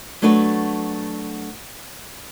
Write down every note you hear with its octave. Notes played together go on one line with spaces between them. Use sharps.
F#3 A3 D4 F#4 B4